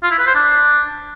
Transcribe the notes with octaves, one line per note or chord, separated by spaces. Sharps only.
F4
E4
B4
C5
D4